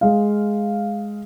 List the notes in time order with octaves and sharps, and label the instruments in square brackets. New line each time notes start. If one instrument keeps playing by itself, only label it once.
[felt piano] G#3 F5